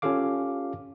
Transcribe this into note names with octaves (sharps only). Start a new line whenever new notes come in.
C#4 F4 G4 A4 F5 D6